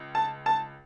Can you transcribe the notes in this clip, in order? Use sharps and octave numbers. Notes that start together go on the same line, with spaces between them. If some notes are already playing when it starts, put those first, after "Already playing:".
Already playing: C#2
A5
A5